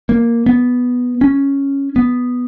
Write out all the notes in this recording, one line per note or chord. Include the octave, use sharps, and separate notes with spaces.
A#3
B3
C#4
B3